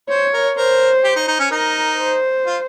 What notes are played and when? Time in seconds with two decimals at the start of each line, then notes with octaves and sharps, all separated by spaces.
0.09 C5 C#5
0.33 A#4
0.57 A#4 C5
1.04 G4
1.16 D#4
1.28 D#4
1.39 C#4
1.51 D#4 A#4
1.98 C5
2.46 F4